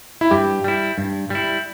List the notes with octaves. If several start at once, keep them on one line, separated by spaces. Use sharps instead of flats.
E4
G2 G4
G3 E4
G2
G3 E4